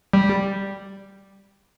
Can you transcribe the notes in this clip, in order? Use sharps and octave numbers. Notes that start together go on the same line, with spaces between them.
G3